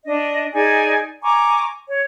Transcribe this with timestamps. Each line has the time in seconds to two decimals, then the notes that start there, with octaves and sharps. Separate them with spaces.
0.06 D4 D#5
0.54 D#4 G#4 D5 G#5
1.23 G#5 A#5 C#6 D6
1.88 C#5